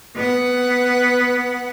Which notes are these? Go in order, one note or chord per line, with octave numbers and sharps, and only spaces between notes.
B3 F#5